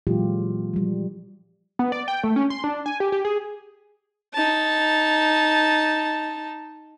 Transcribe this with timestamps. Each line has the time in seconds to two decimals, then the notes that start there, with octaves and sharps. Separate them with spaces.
0.07 A#2 E3 F#3 G#3 F4 G4
0.73 F3 G3
1.79 B3
1.92 D5
2.08 G5
2.24 A3
2.36 C#4
2.50 C6
2.64 D4
2.86 G#5
3.00 G4
3.12 G4
3.25 G#4
4.34 D#4 A5